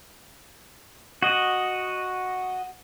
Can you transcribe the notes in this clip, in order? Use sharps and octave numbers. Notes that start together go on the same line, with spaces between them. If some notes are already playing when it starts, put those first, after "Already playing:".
F#4 D#5